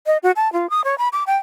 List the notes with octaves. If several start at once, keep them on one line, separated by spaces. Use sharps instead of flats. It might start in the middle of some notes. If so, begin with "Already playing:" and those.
D#5
F#4
A5
F4
D#6
C#5
B5
D6
G5